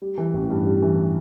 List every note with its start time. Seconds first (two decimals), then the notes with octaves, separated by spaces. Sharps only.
0.02 G3
0.18 E3
0.34 A1
0.50 G2
0.66 G3
0.82 E3